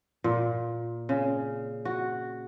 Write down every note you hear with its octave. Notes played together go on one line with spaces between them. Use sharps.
A#2
C#3
F#4